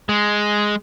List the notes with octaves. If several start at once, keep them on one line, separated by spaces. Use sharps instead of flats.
G#3